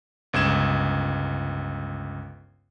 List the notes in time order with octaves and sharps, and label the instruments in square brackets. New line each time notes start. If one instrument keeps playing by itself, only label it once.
[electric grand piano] G1 C#2 G#6 E7